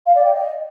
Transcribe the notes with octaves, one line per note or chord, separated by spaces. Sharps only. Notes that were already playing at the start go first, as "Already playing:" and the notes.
F5
D5
G5
D#5